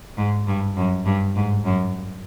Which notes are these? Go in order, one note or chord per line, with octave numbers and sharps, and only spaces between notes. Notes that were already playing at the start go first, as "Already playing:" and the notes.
G#2
G2
F#2
G2
G#2
F#2